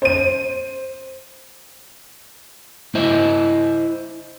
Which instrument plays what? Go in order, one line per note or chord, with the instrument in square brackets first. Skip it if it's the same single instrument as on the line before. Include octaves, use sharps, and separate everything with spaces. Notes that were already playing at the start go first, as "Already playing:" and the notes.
[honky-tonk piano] C5 D#7
[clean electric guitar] E4 C5 D#5 E5